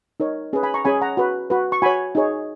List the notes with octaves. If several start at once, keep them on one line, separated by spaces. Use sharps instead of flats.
D#4 A#4 C#5
C#4 G#4 B4
G#5 B5
A#5 C#6
C#4 G#4 C#5 G#5 B5
F#5 A#5
F#4 B4
F#4 B4
C#6
F#4 C#5 G#5 B5
D#4 G#4 C#5